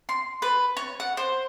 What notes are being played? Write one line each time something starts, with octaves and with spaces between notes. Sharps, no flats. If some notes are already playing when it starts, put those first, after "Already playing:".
C6
B4
C#5
F#5
C5